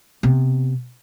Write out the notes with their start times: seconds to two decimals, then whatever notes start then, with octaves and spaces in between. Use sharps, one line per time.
0.23 C3 B3